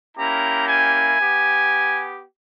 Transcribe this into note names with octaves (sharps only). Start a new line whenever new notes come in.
A#3 C#4 E4 G4 A#5
G#5
B3 G4